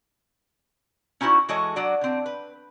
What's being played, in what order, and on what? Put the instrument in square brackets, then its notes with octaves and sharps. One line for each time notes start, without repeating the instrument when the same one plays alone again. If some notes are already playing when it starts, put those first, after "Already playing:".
[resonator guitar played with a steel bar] C#4 D#4 E4 F#4 C5
E3 G#3 F#4 A4 C#5 D#5
F#3 D4 F#4 D5
D3 C4
B4